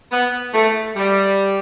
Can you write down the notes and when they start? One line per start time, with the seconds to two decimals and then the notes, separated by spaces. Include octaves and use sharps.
0.11 B3
0.54 A3
0.96 G3